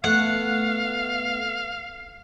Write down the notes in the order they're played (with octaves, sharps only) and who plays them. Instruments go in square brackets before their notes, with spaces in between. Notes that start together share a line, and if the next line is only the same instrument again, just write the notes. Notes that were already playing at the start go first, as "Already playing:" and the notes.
[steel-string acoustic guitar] A3 B3 [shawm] F5 [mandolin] F#5